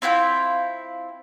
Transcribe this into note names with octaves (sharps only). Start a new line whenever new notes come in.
C4 E4 F4 G5